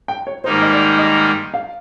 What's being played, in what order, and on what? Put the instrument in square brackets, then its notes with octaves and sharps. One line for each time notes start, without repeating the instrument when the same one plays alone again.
[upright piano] G5
C#5
[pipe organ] G#2 D#3 G3 A#3 D#4 [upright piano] C5
[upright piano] D#5
D5
D#5
F5